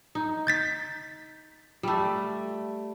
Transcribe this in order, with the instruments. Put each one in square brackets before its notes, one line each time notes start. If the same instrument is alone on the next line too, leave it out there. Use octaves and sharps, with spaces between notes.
[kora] D#4
[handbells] G6 A6 B6
[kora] G3 A3